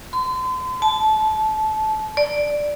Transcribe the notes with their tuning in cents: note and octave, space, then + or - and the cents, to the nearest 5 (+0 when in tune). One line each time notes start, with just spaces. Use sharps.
C6 -40
A5 -25
D5 +0